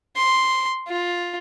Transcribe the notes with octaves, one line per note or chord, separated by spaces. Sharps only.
C6
F4